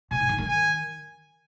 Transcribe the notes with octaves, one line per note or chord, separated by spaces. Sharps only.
A#2 G#5
G#2
D3
D#3
G#5